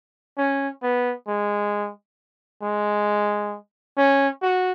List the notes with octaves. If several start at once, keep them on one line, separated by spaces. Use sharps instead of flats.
C#4
B3
G#3
G#3
C#4
F#4